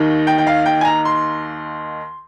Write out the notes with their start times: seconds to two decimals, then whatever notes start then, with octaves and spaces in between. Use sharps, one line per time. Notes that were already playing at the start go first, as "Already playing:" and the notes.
Already playing: D#2 D#3 A#3 D#4
0.27 G5
0.38 G5
0.47 F5
0.66 G5
0.81 G#5
0.85 A#5
1.05 C6